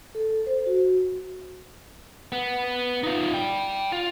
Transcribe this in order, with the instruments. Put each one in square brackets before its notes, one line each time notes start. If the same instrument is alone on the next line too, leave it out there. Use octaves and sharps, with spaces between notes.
[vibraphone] A4
C5
F#4
[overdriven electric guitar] B3
D#4 F4
D5 G5
F4